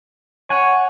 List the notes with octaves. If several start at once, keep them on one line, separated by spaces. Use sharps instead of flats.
C#5 F#5 G#5